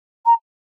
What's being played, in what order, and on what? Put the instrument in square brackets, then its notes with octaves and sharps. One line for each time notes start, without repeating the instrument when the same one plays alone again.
[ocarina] A#5